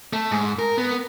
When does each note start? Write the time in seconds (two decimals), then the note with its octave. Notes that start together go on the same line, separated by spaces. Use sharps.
0.13 A3
0.31 G#2
0.59 A#4
0.78 B3